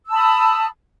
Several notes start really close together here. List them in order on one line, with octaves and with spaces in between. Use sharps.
E6 A5 B5 D#6